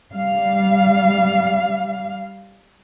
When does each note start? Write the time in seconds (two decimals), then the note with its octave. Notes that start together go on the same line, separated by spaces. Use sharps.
0.12 G3 F5